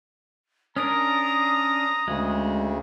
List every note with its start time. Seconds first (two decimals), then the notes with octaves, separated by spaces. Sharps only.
0.76 C#4 D4 A#4 A#5 D#6
2.08 D2 C#3 G#3